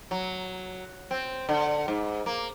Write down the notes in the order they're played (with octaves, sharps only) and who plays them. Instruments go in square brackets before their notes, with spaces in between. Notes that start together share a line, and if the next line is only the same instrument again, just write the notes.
[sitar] F#3
C4
D3
G#2
A#3